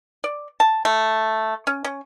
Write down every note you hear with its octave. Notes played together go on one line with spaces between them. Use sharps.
D5
A5
A3
C#4
C#4